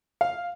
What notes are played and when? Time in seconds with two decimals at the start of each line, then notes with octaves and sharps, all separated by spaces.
0.21 F5